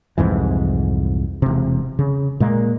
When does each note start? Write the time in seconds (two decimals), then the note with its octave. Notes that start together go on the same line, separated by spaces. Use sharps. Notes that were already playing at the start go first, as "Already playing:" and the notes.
0.18 C2 F2 G#2 E3
1.42 E1 C3
1.99 C#3
2.40 A#2 G#3 A#3